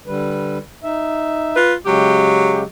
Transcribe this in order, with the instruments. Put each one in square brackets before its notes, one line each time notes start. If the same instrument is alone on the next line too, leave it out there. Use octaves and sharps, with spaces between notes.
[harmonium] D3 G3 B4
D#4 E5
[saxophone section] F4 B4
[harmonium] C#3 G#3 [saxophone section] F#3 G4